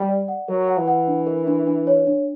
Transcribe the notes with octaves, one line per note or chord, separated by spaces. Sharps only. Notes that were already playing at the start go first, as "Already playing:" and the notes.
Already playing: G3
D5
F#5
F#3 A#4
F#5
E3
F#5
D4
A#4
D4
D4
C#5
D4